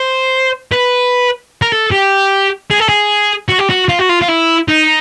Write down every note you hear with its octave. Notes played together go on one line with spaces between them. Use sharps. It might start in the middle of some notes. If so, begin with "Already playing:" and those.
Already playing: C5
B4
A#4
A4
G4
G#4
A4
G#4
F#4
G4
F#4
F4
F#4
F4
F4
E4
D#4